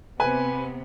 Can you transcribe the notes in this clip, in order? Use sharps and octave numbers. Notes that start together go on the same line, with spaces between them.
C3 B3 B4 G#5